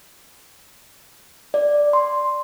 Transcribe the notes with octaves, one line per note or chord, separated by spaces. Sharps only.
D5
C6